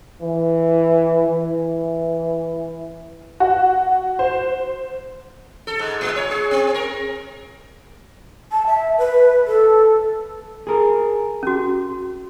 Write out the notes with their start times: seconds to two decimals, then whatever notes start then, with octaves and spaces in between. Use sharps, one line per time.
0.21 E3
1.28 E3
3.40 F#4
4.19 C5
5.67 A4
5.79 G#2
6.01 A2
6.16 C#5
6.31 G#4
6.51 C4
6.74 A#4
8.52 A5
8.67 E5
8.98 B4
9.47 A4
10.67 G#4 A#4
11.43 C#4 F#4